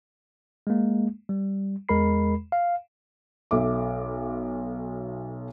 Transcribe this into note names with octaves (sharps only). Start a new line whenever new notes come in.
G#3 A#3
G3
E2 G#3 A#4 B5 C7
F5
B1 A4 E5 D6